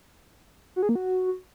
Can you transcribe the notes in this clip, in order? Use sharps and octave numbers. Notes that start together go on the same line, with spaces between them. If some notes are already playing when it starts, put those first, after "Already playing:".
F#4
G#4
A#3
F#4